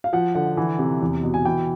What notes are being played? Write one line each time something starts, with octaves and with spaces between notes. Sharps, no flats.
F5
F3 F#5
D3 F#5
E3
C3
E2
B2
G#5
E3 G5